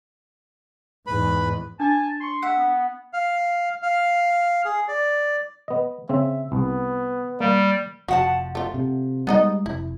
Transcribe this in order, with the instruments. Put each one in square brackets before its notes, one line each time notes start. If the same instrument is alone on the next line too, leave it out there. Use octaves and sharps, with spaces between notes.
[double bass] E2 G#2 [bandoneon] B4 B5
[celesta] D4 [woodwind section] G#5 A5
[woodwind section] C6 C#6
[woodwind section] E5 [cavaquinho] F#5
[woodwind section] B3
[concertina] F5
F5
G#4
D5
[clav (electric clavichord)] B3 D#5
[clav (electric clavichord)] C#3 C4 [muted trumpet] E5
[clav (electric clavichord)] C2 [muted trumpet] B3
[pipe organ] G3 [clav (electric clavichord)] A#3 F5
[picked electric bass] F1 [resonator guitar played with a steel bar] F3 F#5 A5 [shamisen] F#4
[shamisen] A3 F4
[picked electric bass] C3
[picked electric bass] G3 G#3 [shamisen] B3 D#4 D#5
[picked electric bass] F1 [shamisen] E4